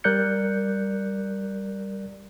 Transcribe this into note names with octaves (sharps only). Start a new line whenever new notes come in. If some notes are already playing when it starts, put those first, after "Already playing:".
G3 A#4 D5 F#6 G6 C#7